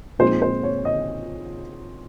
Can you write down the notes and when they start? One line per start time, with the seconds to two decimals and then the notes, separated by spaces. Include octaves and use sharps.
0.19 A#2 F3 G#3 C4 D#4 C5
0.42 C5
0.63 C#5
0.85 D#5